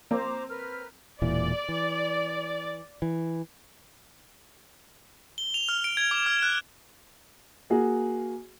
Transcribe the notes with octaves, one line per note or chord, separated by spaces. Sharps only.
F3 A#3 C4 C5 A#5 D6
A#4 B4 F6
E1 A#2 E3 D5
E3
E3
G7
F7
F6
D7
G#6
D6
F6
F#6
A#3 F#4 G#4